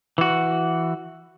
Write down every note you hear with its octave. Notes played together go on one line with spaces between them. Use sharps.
E3 F#4